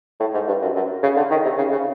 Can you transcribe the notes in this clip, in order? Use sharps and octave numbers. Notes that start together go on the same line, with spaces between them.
A2
G#2
G2
F#2
F#2
C#3
D3
D#3
C3
C#3
C#3